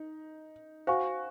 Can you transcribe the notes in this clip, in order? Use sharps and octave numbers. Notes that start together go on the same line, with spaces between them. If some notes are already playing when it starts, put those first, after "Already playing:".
Already playing: D#4
F#4 C5 F5 G#5 C#6